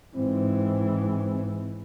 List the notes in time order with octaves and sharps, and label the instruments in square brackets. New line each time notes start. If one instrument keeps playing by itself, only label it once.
[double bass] G#2 E3 [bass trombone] C4